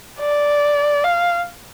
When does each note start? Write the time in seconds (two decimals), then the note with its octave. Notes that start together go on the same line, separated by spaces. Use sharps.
0.20 D5
1.04 F5